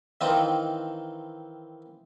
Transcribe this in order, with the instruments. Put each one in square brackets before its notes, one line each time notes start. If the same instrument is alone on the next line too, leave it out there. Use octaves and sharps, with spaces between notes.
[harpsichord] D#3 E3 C4 D#4 F4